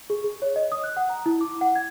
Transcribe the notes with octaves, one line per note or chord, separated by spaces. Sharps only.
G#4
G#4
C#5
D#5
D#6
F#6
F#5
A#5
E4
D6
F#5
G#6